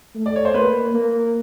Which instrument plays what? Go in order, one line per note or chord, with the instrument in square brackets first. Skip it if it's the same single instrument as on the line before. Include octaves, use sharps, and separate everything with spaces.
[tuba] A3
[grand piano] D5
C#5
C5
[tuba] A#3 [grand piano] B4
[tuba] A#3